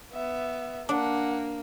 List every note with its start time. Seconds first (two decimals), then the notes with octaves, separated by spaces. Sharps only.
0.13 B3 E5
0.89 A#3 D4 F#5